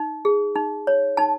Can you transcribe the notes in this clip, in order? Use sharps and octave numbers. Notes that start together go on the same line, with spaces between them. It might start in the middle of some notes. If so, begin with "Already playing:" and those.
Already playing: D#4
G#4
D#4
C#5
D#4 A5